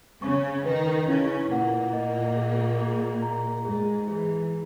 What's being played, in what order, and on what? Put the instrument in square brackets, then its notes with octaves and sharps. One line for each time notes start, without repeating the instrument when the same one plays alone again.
[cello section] C#3 C#4 [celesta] C#6
[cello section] D#3 D#4 [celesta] B4
[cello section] C#3 C#4 [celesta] E4
[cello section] A#2 A#3 [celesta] F#5
[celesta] D#5
G#4
G#4
A#5
[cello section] G#2 G#3 [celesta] G#4
[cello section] E3 [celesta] G#4